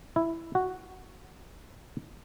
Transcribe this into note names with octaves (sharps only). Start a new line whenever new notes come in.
E4
F#4